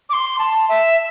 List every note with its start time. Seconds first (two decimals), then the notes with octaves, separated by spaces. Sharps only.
0.09 D6
0.13 C6
0.39 A5
0.69 E5